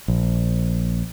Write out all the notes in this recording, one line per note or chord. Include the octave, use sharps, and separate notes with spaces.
A#1